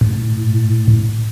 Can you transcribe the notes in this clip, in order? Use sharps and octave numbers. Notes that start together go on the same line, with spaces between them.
A2